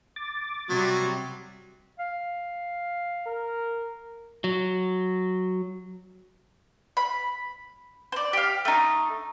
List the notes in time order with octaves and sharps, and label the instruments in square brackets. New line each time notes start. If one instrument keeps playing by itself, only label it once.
[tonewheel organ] D6 A6
[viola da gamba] C3 G3 [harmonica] F#3
[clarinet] F5
[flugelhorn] A#4
[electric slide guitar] F#3
[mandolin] B5
C5 D5
G4 F5
A3 D#4